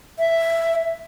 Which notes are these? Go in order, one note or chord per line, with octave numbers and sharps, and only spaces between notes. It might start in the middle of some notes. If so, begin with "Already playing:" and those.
E5